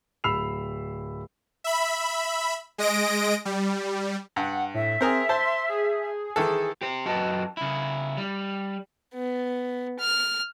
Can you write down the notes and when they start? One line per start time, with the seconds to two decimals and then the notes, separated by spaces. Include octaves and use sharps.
0.24 D1 B5 E6 C7 F7
1.64 E5 B5
2.78 G#3 D#5 A#6 D7
3.45 G3
4.36 G2 F#5
4.74 A2 E5
5.01 C4 G#4 A#4 C5
5.29 C5 A5 C6
5.69 G#4
6.36 D#3 E3 A4
6.81 G4 C5
7.06 F#2 F#4 B4 D#5 G5 A5
7.57 C#3 E4
8.17 G3
9.14 B3
9.99 F6